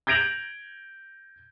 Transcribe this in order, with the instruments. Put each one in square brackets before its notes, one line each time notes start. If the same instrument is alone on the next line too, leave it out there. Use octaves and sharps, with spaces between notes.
[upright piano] G6 G#6 A#6 D7 F7 F#7